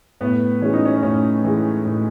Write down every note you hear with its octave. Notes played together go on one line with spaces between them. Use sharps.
A2 B3
E3 G#3 C#4
D#4
C#4
A2 C#4
E3 G#3
A2